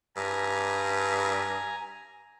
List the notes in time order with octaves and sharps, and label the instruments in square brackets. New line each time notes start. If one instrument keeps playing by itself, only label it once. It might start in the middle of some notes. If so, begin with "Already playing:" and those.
[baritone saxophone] G2 [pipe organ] G#5 A#5